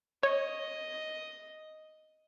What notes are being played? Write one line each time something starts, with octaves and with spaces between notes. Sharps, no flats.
C#5 D#5